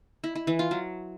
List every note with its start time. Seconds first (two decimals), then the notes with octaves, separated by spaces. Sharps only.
0.24 E4
0.35 E4
0.47 E3
0.59 F4
0.71 F#3